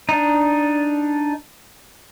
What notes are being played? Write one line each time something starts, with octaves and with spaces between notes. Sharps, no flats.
D4 D#4